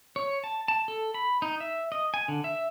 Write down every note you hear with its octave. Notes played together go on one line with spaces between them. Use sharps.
C#5
A5
A5
A4
B5
D#4
E5
D#5
G#5
D3
E5